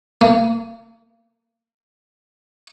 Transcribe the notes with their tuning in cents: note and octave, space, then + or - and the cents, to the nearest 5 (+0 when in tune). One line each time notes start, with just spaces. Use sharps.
A#3 -35